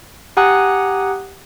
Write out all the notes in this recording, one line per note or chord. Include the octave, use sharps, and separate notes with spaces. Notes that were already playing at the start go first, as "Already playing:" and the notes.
G4 F#5 G#5 A#5 D#6 F#6